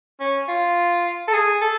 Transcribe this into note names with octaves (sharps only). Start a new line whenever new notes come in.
C#4
F4
A4
G#4
A4